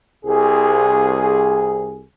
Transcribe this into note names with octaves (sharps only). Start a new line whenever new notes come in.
C2 G#4